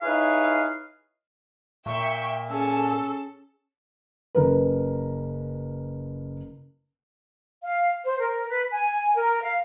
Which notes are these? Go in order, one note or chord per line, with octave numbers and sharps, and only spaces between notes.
D#4 E4 G#4 B4 C#5 F5
A#2 E5 G5 C#6
C#4 G#4 A4 E6
F#1 A#4 B4
F5
C5
A#4
B4
G#5
A#4
F5